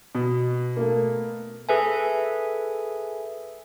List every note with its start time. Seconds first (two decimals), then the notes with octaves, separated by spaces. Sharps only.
0.15 B2
0.77 A3 A#3
1.69 G#4 A4 B4 E5 G#5